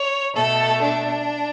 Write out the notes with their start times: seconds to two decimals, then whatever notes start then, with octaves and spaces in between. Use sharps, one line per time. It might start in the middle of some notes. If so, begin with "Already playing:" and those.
Already playing: C#5
0.35 B2 A3 A4
0.81 D4